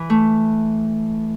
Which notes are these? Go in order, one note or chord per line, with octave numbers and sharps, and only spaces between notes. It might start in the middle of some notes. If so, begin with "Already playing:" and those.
Already playing: E3
A3